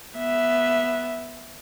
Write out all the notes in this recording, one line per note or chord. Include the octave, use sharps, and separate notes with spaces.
B3 E5